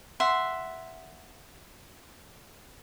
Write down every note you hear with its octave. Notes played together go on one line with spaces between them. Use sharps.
E5 F#5 C6